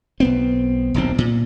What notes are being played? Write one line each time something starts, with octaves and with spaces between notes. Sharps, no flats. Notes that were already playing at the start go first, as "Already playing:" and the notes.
B1 B3 C4
D#1 B1 C4
A#2